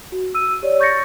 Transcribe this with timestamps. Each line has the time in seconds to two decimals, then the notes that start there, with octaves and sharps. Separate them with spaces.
0.12 F#4
0.35 E6 D#7
0.62 G4 C#5 D5
0.80 C#6 G6 A6 A#6 C#7